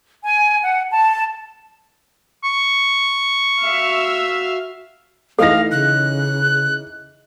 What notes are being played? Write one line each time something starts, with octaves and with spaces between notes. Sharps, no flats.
G#5
F#5
A5
C#6
F#4 E5 F5
E3 A3 D#4 A4 F5 A#6
C#3 F#6